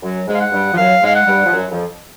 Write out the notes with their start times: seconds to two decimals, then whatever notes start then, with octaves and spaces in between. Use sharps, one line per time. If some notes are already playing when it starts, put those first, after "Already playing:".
0.02 F#2 F#3
0.27 G#2 G#3
0.34 F5
0.40 F#5
0.52 G2 G3
0.73 F3
0.77 F#2 F#3 F5
1.02 G#2 G#3 F5
1.15 F#5
1.27 G2 G3
1.46 F3
1.52 F#2 F#3
1.71 F2 F3